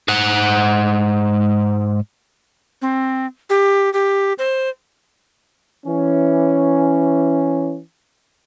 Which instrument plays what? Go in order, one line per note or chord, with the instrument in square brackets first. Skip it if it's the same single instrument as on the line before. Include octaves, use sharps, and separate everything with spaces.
[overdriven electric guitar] G#2 F#5
[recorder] C4
G4
G4
C5
[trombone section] E3 C#4